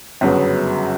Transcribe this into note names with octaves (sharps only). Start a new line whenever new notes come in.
G1 F#2 C#3 F#3 B3